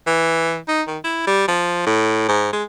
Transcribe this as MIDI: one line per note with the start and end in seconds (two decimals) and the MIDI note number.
0.07 0.58 52
0.68 0.82 63
0.87 0.98 51
1.04 1.25 64
1.27 1.47 55
1.48 1.85 53
1.86 2.24 45
2.28 2.52 44
2.53 2.63 56